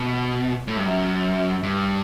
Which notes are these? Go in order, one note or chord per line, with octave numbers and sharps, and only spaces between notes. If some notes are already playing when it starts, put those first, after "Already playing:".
Already playing: B2
A2
G2
F#2
G2